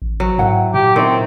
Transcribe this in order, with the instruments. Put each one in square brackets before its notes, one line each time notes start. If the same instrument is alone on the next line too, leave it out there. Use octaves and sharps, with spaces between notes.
[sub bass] A1
[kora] F#3
[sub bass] G#2 [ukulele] E4 F#5 G5
[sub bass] A#2 [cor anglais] G4
[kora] D#3 [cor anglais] C4 [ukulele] E4 C#5